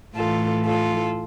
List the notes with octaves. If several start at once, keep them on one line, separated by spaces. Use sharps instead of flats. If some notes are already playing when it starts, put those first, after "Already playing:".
A2 E3 F4 A4
F4 A4